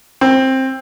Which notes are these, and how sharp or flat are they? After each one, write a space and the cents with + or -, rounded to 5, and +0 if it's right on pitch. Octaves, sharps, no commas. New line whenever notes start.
C4 +15